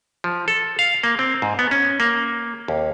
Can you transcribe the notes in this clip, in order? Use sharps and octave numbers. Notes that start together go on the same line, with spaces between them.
F3
A4
F5
A#3
C4
G#2
B3
C#4
A#3
D#2